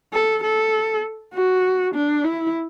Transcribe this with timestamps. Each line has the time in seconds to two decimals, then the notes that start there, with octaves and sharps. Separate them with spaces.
0.13 A4
0.43 A4
1.33 F#4
1.94 D4
2.24 E4